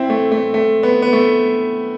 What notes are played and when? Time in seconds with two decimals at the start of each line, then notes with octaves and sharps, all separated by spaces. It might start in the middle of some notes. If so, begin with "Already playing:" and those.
Already playing: C4 E4
0.10 A3
0.32 A3
0.54 A3
0.83 B3
1.02 B3
1.13 A3